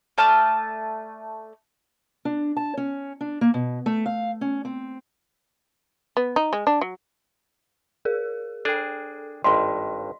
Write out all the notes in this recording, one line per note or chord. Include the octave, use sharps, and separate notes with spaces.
A3 D5 A5 F6
D4
A5
C#4
D4
A#3
B2
A3
F5
C#4
C4
B3
D#4
G#3
D4
F#3
G#4 A#4 F5
D4 G#4 A4 G5
G#1 G2 D5 D#5 C6